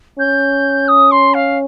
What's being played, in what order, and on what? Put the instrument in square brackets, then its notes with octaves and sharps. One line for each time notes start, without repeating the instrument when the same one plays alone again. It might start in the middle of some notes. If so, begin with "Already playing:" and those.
[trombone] C#4 [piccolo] G6
[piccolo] D#6
C6
F5